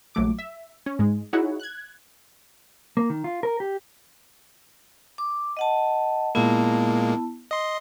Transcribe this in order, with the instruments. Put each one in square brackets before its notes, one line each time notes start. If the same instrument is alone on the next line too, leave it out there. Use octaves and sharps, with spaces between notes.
[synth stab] A#1 F#3 A3 D6
E5
C#4
G#2 G#3
D#4 E4 F#4 G#4 C#5 F#5
F#6 G#6
[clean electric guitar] A#3
D#3
F4
A#4
G4
[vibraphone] D6
D#5 F#5 A5
[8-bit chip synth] A#2 G#3 A#3 [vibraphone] B3 E4 A5
[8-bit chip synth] D#5 C6